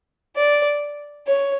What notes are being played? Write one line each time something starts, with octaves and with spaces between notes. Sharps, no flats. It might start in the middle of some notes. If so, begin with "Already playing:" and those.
D5
C#5